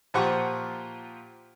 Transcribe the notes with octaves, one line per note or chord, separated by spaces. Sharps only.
A#2 F3 F4 G4 F#5 C#6